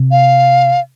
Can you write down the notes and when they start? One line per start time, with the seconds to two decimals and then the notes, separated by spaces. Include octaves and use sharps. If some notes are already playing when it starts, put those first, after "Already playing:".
Already playing: C3
0.11 F5